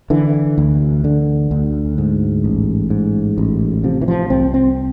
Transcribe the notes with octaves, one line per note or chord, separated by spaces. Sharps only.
D3 E3
D2
D3
D2
G#2
A1
G#2
A1
C3 F3
E3
F3
C2 C4
C4